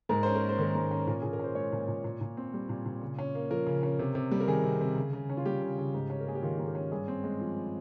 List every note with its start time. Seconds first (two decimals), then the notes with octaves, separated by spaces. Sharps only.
0.09 G#2 A#4
0.23 C#4 C5
0.35 A#4
0.42 A#3
0.49 C5
0.58 D#3 A#4
0.75 G#2
0.91 C#4
1.07 A#2 A#4
1.22 A#2 G#4
1.33 A#4
1.39 C#4 C5
1.55 G#3 C#5
1.72 A#2
1.88 A#2
2.04 A#2
2.21 A#2
2.37 C4
2.54 G3
2.69 A#2
2.86 A#2
3.02 C#3
3.19 C#4
3.35 A#3
3.51 F3 A#4
3.67 C#3
3.83 C#4
3.99 C3
4.15 C3
4.31 G3
4.40 A#4
4.48 D#3 G#4
4.64 C3
4.81 C3
4.96 C#3
5.13 C#3
5.30 C#4
5.37 F4
5.46 G3 G4
5.62 C#3
5.78 C#3
5.94 G#2
6.10 C#4
6.20 A#4
6.26 A#3 G#4
6.35 G4
6.43 D#3 F4
6.58 G#2 F4
6.67 G4
6.75 C#4
6.92 G2 G#4
7.08 C4
7.24 G#3
7.41 F3